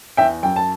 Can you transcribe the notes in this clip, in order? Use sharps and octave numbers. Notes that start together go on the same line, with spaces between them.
E2 E5 G5
F#2 G5
A5